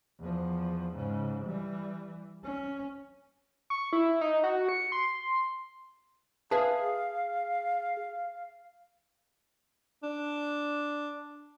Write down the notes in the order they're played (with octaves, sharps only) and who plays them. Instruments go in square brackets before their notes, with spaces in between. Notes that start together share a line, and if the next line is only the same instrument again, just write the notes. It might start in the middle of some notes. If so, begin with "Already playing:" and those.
[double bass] E2 F3
G#2 C#3
E3 G3
C#4
[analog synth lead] C#6
E4
D#4
F#4
C#7
C6
[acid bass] G#4 [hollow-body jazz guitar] B4 E5 A5 [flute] F5
[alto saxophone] D4